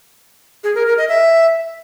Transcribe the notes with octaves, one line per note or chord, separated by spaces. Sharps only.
G#4
A#4
A#4
D#5
E5